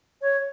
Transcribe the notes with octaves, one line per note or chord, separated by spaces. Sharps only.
C#5